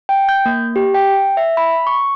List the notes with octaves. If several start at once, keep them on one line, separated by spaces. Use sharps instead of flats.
G5
G6
A#3
G4
G5
E5
B5
C#6